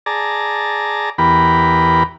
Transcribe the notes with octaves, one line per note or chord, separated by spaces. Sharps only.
G#4 D5 A5 A#5
E2 B3 G4 A#4 B5